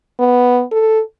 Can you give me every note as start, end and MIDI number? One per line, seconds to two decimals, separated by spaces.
0.19 0.63 59
0.71 1.01 69